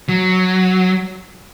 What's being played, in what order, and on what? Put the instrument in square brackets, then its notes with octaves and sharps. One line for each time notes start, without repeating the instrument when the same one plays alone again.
[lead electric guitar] F#3